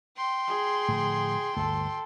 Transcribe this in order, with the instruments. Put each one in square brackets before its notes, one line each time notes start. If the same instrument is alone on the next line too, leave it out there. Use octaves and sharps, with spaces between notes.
[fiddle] G5 C6
[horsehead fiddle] G#4
[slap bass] A2 D3 F3
[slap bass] G1 D2 [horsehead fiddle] A4